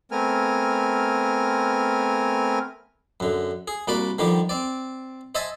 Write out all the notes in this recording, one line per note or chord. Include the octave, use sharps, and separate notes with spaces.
A3 B3 C4 A#4 G#5 F6
F#2 D3
G#4
C2 A#3 F#4 D5 B5
D3 D#3 F3 G3 G4
C4 D5
C5 D#5 E5 G#5 A5 C6